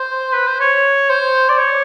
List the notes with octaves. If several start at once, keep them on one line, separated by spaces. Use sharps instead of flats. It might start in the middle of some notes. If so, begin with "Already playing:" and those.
Already playing: C5
B4
C5
C#5
C5
D5
C#5